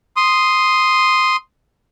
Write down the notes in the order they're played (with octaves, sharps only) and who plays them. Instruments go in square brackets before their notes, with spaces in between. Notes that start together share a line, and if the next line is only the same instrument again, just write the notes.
[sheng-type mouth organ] C6 D#6